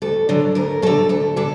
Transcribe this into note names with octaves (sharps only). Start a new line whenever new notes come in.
D2 A4
D3 F#3
D2 A#4
D3 F#3 A4
D2 A4
D3 A4